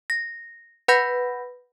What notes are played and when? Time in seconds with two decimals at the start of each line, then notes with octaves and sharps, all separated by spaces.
0.10 A#6
0.88 B4 F#5 B5 G6 A#6